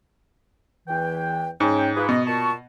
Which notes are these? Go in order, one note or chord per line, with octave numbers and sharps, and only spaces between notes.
E2 E3 G5
G#2 C#4 G5
F4 G#4 B4
B2 D#5
A#2 A5 C#6